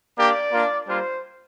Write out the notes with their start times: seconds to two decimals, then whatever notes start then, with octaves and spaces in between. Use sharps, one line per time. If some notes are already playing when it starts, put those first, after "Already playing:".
0.16 A#3 D4 G4 D5
0.51 A#3 D4 F4
0.86 G3 A#3 D4 F4 C5